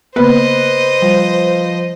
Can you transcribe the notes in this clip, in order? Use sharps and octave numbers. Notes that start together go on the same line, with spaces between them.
C#3 A#3 B3 B4 C5 D#5
F3 G3